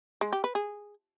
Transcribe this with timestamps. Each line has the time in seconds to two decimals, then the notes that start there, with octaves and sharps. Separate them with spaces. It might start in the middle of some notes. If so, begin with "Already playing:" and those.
0.21 G#3
0.33 G4
0.44 B4
0.55 G#4